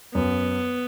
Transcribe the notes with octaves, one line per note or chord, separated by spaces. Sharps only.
F#2 B3